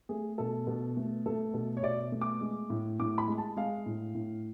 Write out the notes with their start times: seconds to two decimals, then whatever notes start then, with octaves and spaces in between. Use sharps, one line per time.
0.09 A3 G#4
0.38 B2 A4
0.67 B2
0.97 A3
1.26 A3 A4
1.54 B2
1.77 C#5
1.83 B2 D5
2.12 A3
2.21 D6
2.41 G#3
2.70 A2
3.00 A2 D6
3.18 B5
3.28 G#3
3.38 A5
3.57 G#3 F5
3.86 A2
4.15 A2